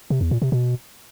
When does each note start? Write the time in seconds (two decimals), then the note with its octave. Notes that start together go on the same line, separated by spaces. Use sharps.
0.10 C3
0.21 E2
0.31 A#2
0.42 C3
0.52 B2